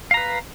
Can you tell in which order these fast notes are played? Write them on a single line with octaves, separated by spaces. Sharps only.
F5 A#5 B4